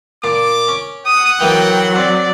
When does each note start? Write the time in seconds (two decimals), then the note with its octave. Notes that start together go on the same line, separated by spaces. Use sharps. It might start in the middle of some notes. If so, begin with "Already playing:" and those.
0.24 A#2 D4 D6
0.68 C#4
1.07 F#5 D#6
1.41 E3 F#3 A#3 B3 G5
1.95 C4 D5